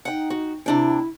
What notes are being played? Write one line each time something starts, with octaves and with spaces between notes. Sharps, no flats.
D#4 F#5 G5
F#4
C3 D4 E4 G5